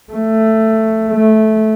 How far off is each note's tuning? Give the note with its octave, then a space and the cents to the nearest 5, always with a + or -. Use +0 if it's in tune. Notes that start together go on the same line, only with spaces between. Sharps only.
A3 +10
A3 -15